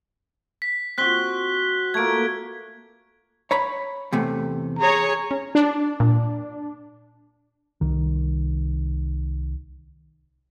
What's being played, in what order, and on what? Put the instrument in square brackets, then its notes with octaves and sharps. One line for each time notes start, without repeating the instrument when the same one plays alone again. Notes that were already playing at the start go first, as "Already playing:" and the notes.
[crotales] B6
[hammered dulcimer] C4 F#4 [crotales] F#6 B6 G7
[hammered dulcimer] A3 A#3 [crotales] G#6 D7
[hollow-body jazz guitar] C#5 A#5 B5
E2 C3 A3
[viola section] G#4 C#5 [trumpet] A#5
[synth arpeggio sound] C#4
[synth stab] D4
[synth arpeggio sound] A#2
[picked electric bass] C2 D#3